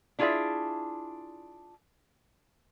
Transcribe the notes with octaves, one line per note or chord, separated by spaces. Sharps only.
D4 E4 F4 G#4 D5 E5